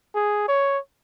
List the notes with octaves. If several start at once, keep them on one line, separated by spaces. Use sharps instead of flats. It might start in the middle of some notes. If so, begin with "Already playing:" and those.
G#4
C#5